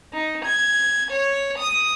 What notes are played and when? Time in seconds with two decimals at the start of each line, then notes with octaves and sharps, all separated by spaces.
0.13 D#4
0.45 G#6
1.11 C#5
1.58 D#6